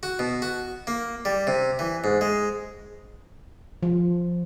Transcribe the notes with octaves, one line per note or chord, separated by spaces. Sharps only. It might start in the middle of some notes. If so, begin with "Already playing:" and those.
F#4
B2
F#4
A#3
G3
C3
E3
G#2
G#3
F3